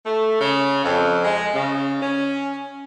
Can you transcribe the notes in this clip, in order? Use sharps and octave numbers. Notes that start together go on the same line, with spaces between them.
A3
C#3
F2
G#3
C#3
C#4